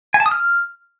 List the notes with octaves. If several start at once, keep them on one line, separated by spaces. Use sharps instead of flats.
G#5
A5
D#6
F6